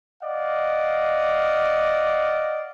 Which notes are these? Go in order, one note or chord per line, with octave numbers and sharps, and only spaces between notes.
D5 D#5 F5 F#5